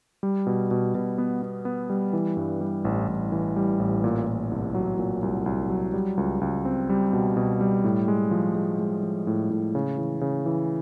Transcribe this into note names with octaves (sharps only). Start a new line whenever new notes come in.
G3
B2
B2
B2
B3
B3
B3
G3
E3
G2
G3
A1
A1
E3
G3
A1
A#2
A#2
C2
F#3
A#2
C2
C2
F#3
G3
C#2
C#2
C4
G3
B2
B2
G3
A2
G#3
F3
G#3
G#3
F3
A2
A2
C#3
E3
C#3
E3